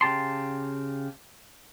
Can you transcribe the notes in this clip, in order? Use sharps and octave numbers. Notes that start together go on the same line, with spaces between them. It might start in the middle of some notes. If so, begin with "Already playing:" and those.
C#3 G4 A5 C6